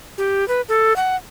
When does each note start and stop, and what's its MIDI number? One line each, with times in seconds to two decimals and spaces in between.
0.18 0.47 67
0.48 0.61 71
0.69 0.96 69
0.96 1.16 78